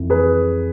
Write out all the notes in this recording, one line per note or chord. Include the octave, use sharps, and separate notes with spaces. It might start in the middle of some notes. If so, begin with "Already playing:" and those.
Already playing: F2 E3
G#4 B4